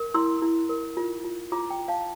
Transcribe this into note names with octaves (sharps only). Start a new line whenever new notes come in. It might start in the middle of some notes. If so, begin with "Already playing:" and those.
Already playing: A#4
E4 C6 E6
E4
A#4
F4
F4
F4 A#5 D6
G5 A#5
F4
F5 A5